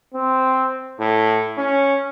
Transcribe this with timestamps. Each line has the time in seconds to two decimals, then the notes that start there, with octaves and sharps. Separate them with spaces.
0.14 C4
1.00 A2
1.58 C#4